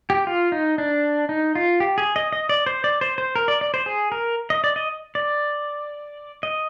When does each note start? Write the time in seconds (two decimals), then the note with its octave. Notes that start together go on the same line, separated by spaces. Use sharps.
0.10 G4
0.27 F4
0.52 D#4
0.78 D4
1.29 D#4
1.55 F4
1.80 G4
1.98 G#4
2.16 D#5
2.33 D#5
2.49 D5
2.66 C5
2.84 D5
3.01 C5
3.18 C5
3.35 A#4
3.48 D5
3.61 D5
3.74 C5
3.86 G#4
4.12 A#4
4.50 D#5
4.64 D5
4.76 D#5
5.15 D5
6.43 D#5